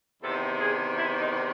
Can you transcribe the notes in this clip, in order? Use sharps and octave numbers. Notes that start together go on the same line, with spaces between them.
E2 C3 D#3 A4
G#4
E4
D#4